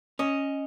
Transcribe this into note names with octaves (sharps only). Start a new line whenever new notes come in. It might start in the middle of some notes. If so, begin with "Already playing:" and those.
C#4 D#5